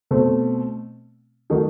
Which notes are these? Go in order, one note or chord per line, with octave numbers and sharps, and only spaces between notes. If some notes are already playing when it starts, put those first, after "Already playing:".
B2 A3 C4
D#3 F#3 A3 D#4